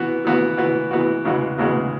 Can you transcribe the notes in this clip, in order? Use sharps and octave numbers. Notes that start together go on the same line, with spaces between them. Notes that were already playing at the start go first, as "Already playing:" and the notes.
Already playing: E3 B3 F#4
E3 B3 F#4
E3 B3 F#4
E3 B3 F#4
E2 C#3 G#3 B3 F#4
E2 C#3 G#3 B3 F#4